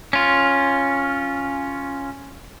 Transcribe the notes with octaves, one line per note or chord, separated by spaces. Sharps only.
C#4 F4